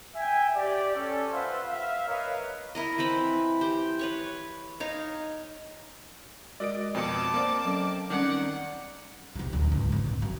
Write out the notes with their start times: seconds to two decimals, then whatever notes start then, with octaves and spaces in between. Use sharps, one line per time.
0.16 E5 G5 G#5
0.56 G4 D5
0.95 C#4 A4
1.33 F4 B4 C5 E5 F#5
1.69 E5 F5
2.08 A#4 B4 C#5 D#5 F5
2.75 E4 A#4 D#5
2.98 E3 C4 B5
3.61 G4 C5
3.99 B4 C#5 C#6
4.80 D#4 C#5 F5
6.60 G#3 F#4 A#4 D5 D#5 D7
6.95 F2 B2 A5 D6 C#7
7.34 A#3 C4 D5
7.65 F#3 C#4 A4
8.10 D#3 G3 C4 C#4 D5 F#5
9.35 B1 C3
9.53 D1
9.72 C#2 G#2
9.92 A2 C4
10.06 D2
10.22 F#2